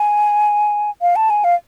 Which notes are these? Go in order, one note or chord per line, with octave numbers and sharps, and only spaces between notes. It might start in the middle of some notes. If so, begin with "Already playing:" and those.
Already playing: G#5
F5
A5
G#5
F5